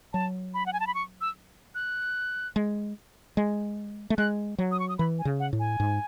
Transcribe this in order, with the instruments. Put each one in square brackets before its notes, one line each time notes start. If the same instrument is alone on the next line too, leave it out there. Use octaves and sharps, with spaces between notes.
[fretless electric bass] F#3 [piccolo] A5
[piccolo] B5
F#5
G#5
A5
B5
C#6
E6
F#6
[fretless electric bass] G#3
G#3
A3
[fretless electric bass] G#3 [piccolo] F#6
[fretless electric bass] F#3
[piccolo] D#6
C#6
D#6
[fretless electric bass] E3 [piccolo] B5
[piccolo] G#5
[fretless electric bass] C#3
[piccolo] F#5
[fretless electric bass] A2
[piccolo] G#5
[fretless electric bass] G#2